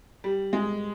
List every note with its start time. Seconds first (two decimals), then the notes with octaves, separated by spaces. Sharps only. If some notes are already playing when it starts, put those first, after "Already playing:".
0.24 G3
0.53 G#3